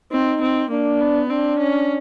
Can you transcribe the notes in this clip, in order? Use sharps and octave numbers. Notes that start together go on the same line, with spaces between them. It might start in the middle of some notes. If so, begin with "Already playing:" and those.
C4 D#4
C4
A#3 D4
B3
C4 D4
C#4